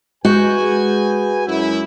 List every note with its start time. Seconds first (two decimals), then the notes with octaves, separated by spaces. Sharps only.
0.25 G#3 F#4 G#4 B4 G#5 G6
1.47 F#2 E4